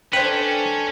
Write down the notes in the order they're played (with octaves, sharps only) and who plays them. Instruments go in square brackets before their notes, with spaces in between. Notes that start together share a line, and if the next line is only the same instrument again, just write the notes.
[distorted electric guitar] C#4 [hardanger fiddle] D4 A4 [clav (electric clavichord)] B4 [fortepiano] C5 G5